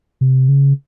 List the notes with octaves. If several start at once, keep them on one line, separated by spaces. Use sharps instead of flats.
C3
C#3